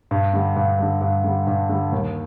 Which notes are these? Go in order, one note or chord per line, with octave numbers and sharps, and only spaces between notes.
G2
D3 G3
G2
D3 G3
G2
D3 G3
G2
D3 G3
D#2